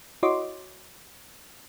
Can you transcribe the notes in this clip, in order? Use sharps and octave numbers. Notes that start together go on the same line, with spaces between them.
E4 F#4 C#5 D#5 C6 D6